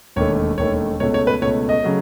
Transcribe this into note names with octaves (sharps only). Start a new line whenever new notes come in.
E1 D#2 D#3 A3 C#5
E1 D#2 D#3 A3 C#5
C#2 B2 A3 C#5
C#5
B4
C#2 B2 A3 C#5
D#5
C#3 F#3 A3